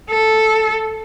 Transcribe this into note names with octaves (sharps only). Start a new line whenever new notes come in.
A4